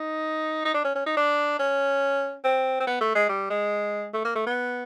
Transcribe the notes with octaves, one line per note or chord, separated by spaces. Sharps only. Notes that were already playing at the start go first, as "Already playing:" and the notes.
Already playing: D#4
D#4
D4
C#4
C#4
D#4
D4
C#4
C4
C4
B3
A3
G#3
G3
G#3
A3
A#3
A3
B3